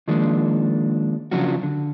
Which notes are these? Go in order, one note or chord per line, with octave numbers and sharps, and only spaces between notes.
D#3 F3 G#3 A#3 D4
C#3 F3 F#3 D4 F4 F#4
D3